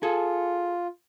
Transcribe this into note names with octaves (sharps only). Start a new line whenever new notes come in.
F4 G#4 A4